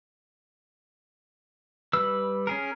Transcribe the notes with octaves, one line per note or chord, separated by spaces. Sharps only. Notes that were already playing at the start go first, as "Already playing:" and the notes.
G3 B4 E6
C#4 G#4 A#4